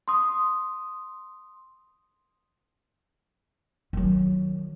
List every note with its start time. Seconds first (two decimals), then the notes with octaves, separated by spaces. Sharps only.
0.08 C6 D#6
3.93 D#3 F#3